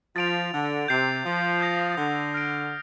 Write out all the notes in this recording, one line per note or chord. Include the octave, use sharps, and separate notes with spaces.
F3 A6 D7 F7
D3
C3 G6 C7 F7
F3
D#6 G6 A#6
D3
F6 A#6 D7